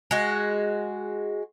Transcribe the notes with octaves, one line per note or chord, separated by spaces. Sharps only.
G#3 F#4